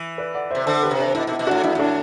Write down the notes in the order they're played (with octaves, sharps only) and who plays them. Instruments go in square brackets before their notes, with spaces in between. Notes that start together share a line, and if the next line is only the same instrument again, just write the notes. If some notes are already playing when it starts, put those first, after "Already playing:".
Already playing: [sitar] E3
[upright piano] B4 D5
D5 F#5
[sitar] C3 [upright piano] C5 E5
[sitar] D3 [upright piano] A4 C5
[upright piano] G4 B4
[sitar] C3
[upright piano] D4
[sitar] B2 [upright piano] E4
[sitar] B2
[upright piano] E4
[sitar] B2
[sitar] A2 [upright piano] D4 F#4
[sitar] G2 [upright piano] E4
[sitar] A2 [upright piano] D4 F#4